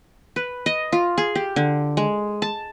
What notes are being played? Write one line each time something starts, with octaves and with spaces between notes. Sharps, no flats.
B4
D#5
F4
G#4
G4
D3
G#3
A5